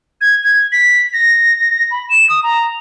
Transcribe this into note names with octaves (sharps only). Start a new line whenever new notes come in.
G#6
G#6
B6
A#6
B5
E7
D#6
A#5